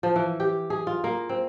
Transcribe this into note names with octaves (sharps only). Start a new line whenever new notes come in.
F3
E3
G4
G#4
F4
A#3
C4